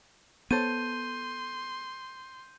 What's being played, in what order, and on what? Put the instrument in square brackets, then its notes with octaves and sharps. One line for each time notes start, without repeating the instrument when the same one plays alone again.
[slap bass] B3 [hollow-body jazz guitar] A4 C5 C#5 [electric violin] C6 [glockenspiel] G6 D#7